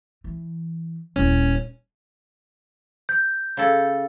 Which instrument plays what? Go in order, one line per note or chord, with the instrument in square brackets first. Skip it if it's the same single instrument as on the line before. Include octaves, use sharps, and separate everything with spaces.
[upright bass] E3
[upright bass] D#1 E4 [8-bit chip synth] C#4
[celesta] G6
[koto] C#3 A4